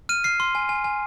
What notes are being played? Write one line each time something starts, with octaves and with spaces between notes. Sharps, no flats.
F6 D#7
F6 C7
C6
G#5
G#5
G#5